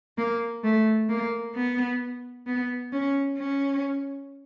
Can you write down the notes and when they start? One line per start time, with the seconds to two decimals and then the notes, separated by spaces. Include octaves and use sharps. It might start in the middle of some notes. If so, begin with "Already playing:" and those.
0.18 A#3
0.64 A3
1.09 A#3
1.55 B3
2.47 B3
2.92 C#4
3.38 C#4